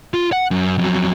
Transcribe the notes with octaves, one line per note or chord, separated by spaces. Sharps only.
F4
F#5
F#2
F2 F#3